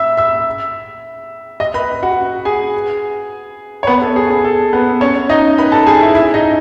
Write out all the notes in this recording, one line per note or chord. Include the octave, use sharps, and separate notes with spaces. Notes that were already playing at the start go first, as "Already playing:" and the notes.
Already playing: E5 E6
E5 E6
D#5 D#6
B4 B5
F#4 F#5
G#4 G#5
C#5
B3 B4
A4
G#4
G#4
A4
B3 B4
C#4 C#5
D#4 D#5
B4 B5
A4 A5
G#4 G#5
E4 E5
E4 E5
D#4 D#5